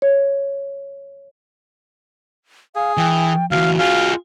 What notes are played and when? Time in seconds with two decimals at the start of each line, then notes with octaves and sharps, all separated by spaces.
0.02 C#5
2.76 G#4 F5
2.97 E3 G5
3.51 D2 E3 F#4 F5
3.79 F4 G#4 F5